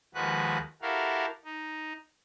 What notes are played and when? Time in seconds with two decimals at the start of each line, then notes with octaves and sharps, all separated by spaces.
0.14 D#2 F3 G#3 F#4 B4 F#6
0.82 E4 F#4 G4 A4 A#4 F5
1.45 D#4